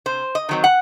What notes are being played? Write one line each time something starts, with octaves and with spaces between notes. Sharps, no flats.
C3 C5
D#5
D#3 F#3 A3 C4
F#5